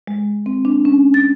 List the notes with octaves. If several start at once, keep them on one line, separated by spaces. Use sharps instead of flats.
G#3
C4
D4
C#4
A6